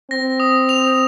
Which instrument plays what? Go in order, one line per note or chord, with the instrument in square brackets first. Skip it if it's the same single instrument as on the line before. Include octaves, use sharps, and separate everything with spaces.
[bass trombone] C4 [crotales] A#6
[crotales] D#6
F7